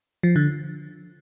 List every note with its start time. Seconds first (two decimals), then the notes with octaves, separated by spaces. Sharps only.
0.23 F3
0.36 D3